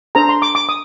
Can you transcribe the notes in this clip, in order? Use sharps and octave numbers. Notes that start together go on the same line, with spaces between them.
D4 A4 C5 A#5
C6
D6
D6
D#6